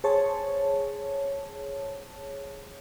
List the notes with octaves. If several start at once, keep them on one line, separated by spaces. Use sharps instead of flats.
G#4 C5 C#5 A5